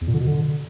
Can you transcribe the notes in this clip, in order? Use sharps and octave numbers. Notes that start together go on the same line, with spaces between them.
E2
A#2
D3
B2
D3